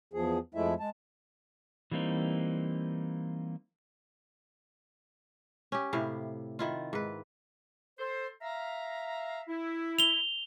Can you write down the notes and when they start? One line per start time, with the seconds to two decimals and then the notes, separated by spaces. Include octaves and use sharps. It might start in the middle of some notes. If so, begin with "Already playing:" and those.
0.14 E2 F3 G#4
0.55 F2 F3 G#3 A3 E4 E5
0.80 G#3 A5
1.92 E3 G3 A#3 C4 D#4
5.72 C#4 G4
5.93 A2 C3 E4 F5
6.59 D#3 E4 F4
6.93 G#2 B4
7.99 A4 C5
8.42 E5 F5 A#5
9.48 E4
9.99 F7 G7